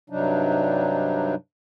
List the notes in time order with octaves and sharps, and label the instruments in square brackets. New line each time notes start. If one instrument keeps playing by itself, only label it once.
[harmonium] G2 C3 F#3 G3 D4 D#4